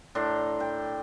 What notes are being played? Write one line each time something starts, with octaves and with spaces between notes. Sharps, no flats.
A2 D4 A#5 C6
G5